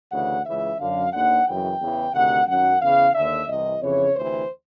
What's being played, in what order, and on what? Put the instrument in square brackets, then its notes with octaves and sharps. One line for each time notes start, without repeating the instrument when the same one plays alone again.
[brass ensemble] D2 C#3 E3 F#5
C#2 C#3 E3 E5
F#2 D3 F5
D#2 D3 F#5
F#2 C#3 E3 G5
E2 C#3 E3
D2 C3 D#3 F#5
F#2 D#3 F#5
E2 C#3 E3 F5
D#2 D3 E5
C2 C3 E3 D#5
F2 C#3 E3 C#5
D2 C3 E3 C5